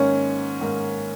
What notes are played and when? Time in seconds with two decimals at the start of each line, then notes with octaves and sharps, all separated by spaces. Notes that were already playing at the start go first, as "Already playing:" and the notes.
Already playing: G#2 D#3 A#3 C#4
0.61 G#2 D#3 A#3